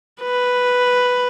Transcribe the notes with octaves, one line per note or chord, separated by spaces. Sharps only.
B4